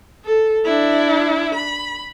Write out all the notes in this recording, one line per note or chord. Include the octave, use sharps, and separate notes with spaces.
A4
D4 E4
B5